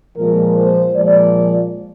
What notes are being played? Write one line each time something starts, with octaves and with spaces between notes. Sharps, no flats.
A#2 F3 G#3 A#4
C5
A#2 F3 G#3 D5